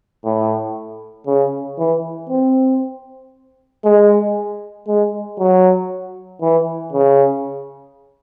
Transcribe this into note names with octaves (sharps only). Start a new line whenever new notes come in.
A2
C#3
E3
C4
G#3
G#3
F#3
E3
C#3